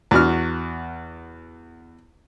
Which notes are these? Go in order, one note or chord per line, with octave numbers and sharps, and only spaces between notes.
E2 F#4 F6